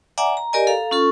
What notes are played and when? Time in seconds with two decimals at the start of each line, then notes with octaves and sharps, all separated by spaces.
0.18 D5 E5 F#5 G#5 A#5 D6
0.37 A#5
0.53 G4 A#4 D5 D#5 G#5
0.67 A4 F5 A#5
0.91 C#4 F4 A4 C#6